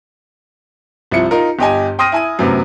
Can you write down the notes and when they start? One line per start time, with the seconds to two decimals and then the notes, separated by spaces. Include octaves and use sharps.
1.11 C2 F3 E4 C#7
1.31 D#4 F4 A#4
1.59 G1 G4 D#5 G#5
1.99 G5 C6 D#6 F6 A#6 D#7
2.12 E4 G#5 D#7
2.39 F#2 A2 C3 B3